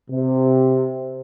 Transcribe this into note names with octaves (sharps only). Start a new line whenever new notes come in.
C3